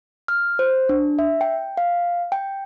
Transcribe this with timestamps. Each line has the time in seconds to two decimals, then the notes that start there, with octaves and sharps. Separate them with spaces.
0.28 F6
0.59 C5
0.89 D4
1.19 E5
1.41 G5
1.77 F5
2.32 G5